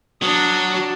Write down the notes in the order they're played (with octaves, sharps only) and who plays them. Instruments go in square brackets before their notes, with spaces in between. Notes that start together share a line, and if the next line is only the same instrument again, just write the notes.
[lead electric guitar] F#3 [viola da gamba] D4 [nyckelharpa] D#6